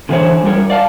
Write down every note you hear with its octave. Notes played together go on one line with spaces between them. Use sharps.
D3 E3 D#4 G#4 C5 C#5
G3 F4 F#4 A#4 C#5
D5 F5 A5